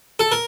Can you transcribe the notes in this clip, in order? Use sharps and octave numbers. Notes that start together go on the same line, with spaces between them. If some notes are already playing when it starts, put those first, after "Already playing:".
A4
A#4